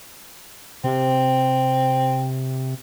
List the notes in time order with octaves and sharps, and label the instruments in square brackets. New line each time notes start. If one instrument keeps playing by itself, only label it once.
[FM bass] C3 [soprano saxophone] C4